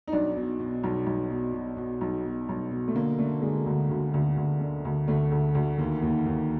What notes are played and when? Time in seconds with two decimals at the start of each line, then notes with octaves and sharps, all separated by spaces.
0.08 D#4
0.12 B1 D4
0.36 B2
0.60 B2
0.83 B1
1.06 B1
1.30 B2
1.54 B2
1.77 B2
2.01 B1
2.25 B2
2.49 B1
2.71 B2
2.88 A3
2.95 D3 A#3
3.19 D3 A3
3.42 D3 G#3
3.66 D2
3.90 D2
4.14 D2
4.37 D2
4.61 D3
4.85 D2
5.08 D2 A3
5.31 D2
5.55 D2
5.78 D#2 A#3
6.03 D#2
6.26 D#2